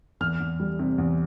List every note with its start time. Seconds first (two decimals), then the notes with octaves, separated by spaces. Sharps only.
0.20 E2 F6
0.40 E2
0.60 G3
0.79 C3
0.98 E2